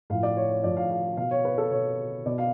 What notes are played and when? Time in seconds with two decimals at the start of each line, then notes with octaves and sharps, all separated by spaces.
0.10 A2 F3 F5
0.23 D5
0.37 C#5
0.50 C#5
0.64 A2 F3 D5
0.77 F5
0.91 F5
1.17 B2 F5
1.31 C#5
1.45 B4
1.58 A4
1.71 B2 C#5
2.26 B2 D5
2.38 F5